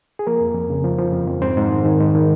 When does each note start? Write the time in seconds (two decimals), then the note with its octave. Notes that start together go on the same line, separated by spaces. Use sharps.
0.19 G#4
0.27 F3 A#3 A#4
0.41 F2
0.55 F2
0.70 C#3
0.84 F3
0.98 F3
1.13 F2
1.28 F2
1.42 G#2 C4 C5
1.57 G#2
1.71 D#3
1.85 D#3
2.00 G#2
2.15 D#3